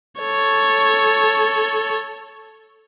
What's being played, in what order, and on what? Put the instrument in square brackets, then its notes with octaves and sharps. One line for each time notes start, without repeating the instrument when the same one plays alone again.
[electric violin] A4 C#5